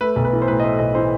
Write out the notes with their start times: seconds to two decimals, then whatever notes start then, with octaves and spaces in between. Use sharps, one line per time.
0.01 A3 B4
0.16 B1
0.25 B4
0.33 E3
0.42 C5
0.48 A2 B4
0.60 D#5
0.63 A3 C5
0.79 B1 D#5
0.95 E3 C5